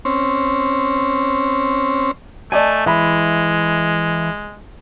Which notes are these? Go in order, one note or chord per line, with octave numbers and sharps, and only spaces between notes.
C4 C#4
A3 D5 D#5 G#5 A5
E3 G#3 E5 B5